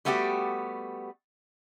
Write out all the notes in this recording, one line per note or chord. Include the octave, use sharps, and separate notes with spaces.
G3 A3 B3 F#4 G4